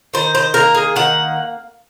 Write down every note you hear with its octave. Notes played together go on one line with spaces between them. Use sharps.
D#3 C5
C5
A#3 A#4
G#4
D#3 F#5